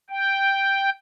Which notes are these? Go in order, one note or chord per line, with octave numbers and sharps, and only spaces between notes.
G5